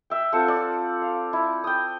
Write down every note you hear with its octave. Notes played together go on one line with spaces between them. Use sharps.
E5 G5
C4 F4 A4 F#5
D5
F5
E4
G5 D#6